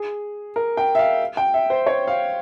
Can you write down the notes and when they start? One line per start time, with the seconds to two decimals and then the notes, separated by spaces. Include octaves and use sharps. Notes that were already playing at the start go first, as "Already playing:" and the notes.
Already playing: G#4
0.56 A#4
0.77 G5
0.95 E5
0.99 F5
1.37 G5
1.54 E5
1.70 C5
1.87 C#5
2.08 F5